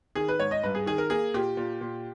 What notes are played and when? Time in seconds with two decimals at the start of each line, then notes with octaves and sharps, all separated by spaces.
0.15 D#3 G#4
0.28 B4
0.39 G#2 C#5
0.51 D#5
0.63 G2 B4
0.75 G#4
0.86 D#3 G#4
0.98 A#4
1.10 A#3 G#4
1.34 A#2 G4
1.57 A#2
1.81 A#2